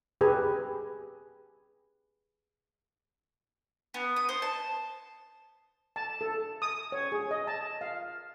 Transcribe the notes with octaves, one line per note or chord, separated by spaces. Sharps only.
G4 G#4 B4 G#5
B3
D#6
C5
A5
A5
A4
D#6
C#5
G#4
D#5
A5
F5